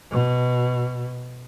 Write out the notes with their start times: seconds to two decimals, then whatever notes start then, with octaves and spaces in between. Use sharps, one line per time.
0.11 B2